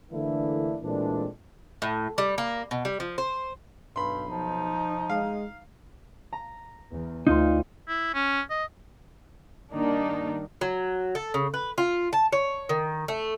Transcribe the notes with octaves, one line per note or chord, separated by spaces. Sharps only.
D3 E3 A3 A#3 D4 E4
A#2 E3 G#3 A3 C4 D4
A2
G3
A#3
B2
G3
F3
C5
B1 G2 B5 C6
F3 D#4
G#3 F5
A#5
E2
D2 D#4 F4 C6
E4
C#4
D#5
G2 D#3 A#3 D4 D#4
F#3
A4
C#3
B4
F4
A5
C#5
D#3
A3